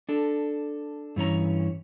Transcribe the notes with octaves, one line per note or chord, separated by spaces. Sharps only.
D4 A4
G2 E3 C#4 A#5